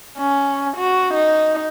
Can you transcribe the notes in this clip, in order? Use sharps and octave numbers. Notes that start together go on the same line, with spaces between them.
C#4
F#4
D#4